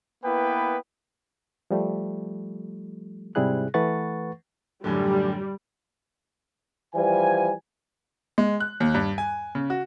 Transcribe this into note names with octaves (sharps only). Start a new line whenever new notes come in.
A#3 B3 E4 B4 G5
F3 G3 A3
G#2 C3 G3 E4 G#4 F#6
E3 A3 B4 F#5 C#6 A6
F#2 A2 D3 G3
E3 F3 G3 G#5
G#3
F#6
D#2
G2
G#5
C#3
F#4